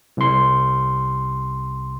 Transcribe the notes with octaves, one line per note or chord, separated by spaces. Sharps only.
C2 C6